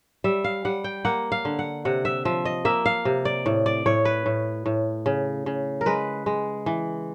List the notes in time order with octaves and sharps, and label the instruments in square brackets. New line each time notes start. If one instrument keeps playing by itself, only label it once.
[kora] G3 E5
F5
G3 F#5
G5
A#3 F#5
F5
D3
F#5
C3 F#5
E5
F3 E5
D#5
A#3 E5
F5
C3
D5
A2
D5
A2 C#5
B4
A2
A2
C#3
C#3
A#4
G#3 B4
G#3
E3